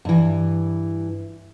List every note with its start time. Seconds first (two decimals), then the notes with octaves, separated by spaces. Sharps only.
0.05 G2 E3